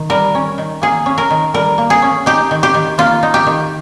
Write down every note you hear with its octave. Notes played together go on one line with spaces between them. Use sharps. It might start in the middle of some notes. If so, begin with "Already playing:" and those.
Already playing: D#3
G3 A#4
C#4
D#3
A#3 G#4
C#4
A#4
D#3
G3 A#4
A#3
G#4
C#4
D#4 G4
D#3
G4
D#3
A#3 F4
D#4
G4
D#3